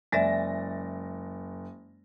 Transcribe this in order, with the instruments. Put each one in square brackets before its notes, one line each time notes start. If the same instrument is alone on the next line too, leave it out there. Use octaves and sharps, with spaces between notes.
[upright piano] F#1 A6 A#6 [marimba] G#3 D5 E5